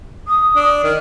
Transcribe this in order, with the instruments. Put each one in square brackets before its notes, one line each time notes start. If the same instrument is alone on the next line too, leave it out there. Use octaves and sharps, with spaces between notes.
[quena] D#6
[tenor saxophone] D4
D#3